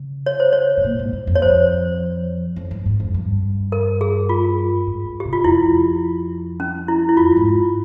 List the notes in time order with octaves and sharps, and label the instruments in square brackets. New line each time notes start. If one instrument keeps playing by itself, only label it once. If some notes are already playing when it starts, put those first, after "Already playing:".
Already playing: [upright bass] C#3
[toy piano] C#5
C5
C#5
[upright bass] G#2
A#2
G#2
G2
F2
[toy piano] C#5
C5
[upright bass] F2
G2
G#2
F2
G2
[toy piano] A#4
G#4
F4
[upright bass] G#2
[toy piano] G4
[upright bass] C3
[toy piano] F4
[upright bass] F2 [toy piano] E4
[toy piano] C#4
E4
E4
[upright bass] F2 [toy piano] F4
[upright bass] G#2